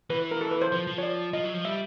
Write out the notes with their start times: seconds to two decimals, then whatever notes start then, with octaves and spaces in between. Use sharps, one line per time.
0.10 E3 B4
0.31 A#4
0.41 A4
0.51 B4
0.62 C5
0.72 F3
0.87 F3
0.98 C#5
1.03 D5
1.33 F3 D#5
1.44 F#3
1.54 F3
1.65 G3 E5